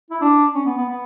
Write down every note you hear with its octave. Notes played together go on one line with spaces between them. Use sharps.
E4
D4
C#4
B3
B3
B3